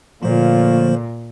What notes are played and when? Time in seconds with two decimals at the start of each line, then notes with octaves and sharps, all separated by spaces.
0.23 A#2 D3 F3 A3 A#3 F4 C5 C#5